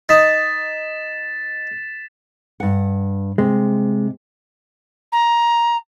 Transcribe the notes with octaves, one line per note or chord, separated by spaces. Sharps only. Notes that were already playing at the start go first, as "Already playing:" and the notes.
D#4 A6 B6 E7
G2 F#5
C3 G#3
A#5